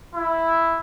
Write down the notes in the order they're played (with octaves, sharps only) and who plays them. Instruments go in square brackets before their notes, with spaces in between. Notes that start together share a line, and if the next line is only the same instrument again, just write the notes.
[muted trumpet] E4